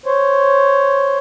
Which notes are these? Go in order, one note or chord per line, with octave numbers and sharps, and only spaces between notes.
C5 C#5